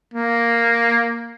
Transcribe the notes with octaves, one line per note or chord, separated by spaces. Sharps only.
A#3